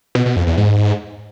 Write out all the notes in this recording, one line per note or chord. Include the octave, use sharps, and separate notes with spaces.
B2
B2
F2
E2
G#2